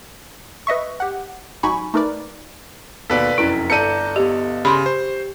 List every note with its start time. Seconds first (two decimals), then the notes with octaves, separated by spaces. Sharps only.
0.67 B4 D#5 E5 C#6
1.00 G4 F#5
1.63 A1 F#3 D#4 G#5 B5 C#6
1.94 A3 D#4 A#4 B4 D5
3.10 D#2 B2 A4 B4 D5 B6
3.38 F1 F#2 E4
3.70 G1 A4 D5 A#5 G6 C#7 D#7
4.16 B3 G4 D#5
4.65 C#3 G4 B5 C6
4.86 C5